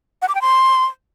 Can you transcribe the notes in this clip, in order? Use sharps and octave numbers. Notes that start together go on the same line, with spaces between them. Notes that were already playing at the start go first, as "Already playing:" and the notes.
F#5
D6
G5
C6